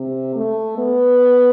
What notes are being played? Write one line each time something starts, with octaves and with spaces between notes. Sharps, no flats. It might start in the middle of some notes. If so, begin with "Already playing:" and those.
Already playing: C3
A3
B3